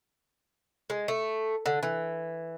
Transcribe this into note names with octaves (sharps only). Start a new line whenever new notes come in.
G#3
A3
D3
E3